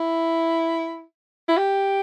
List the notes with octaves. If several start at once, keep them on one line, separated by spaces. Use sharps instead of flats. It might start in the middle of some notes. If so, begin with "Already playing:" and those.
Already playing: E4
E4
G4